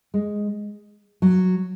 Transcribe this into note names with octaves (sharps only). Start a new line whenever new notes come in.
G#3
F#3